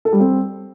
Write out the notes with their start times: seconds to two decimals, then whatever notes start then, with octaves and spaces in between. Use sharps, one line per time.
0.05 A4
0.13 G3
0.20 C4